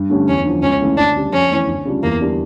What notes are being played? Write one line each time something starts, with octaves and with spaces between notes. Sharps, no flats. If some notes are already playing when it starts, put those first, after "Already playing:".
Already playing: G2
D3 A3 C#4 G4
E2 C#4
D3 F3
C#2 C#4
C#3 E3 A3 C#4
D2 D4
C#3 G3
F2 C#4
E3 A3
D2
C#3 G3 D4 F4
E2 A#3
D3 G3 D4